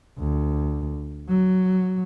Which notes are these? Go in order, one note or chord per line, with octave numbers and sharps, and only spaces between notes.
D2
F#3